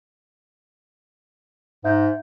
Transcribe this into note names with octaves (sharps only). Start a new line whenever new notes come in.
G#2 E5 G6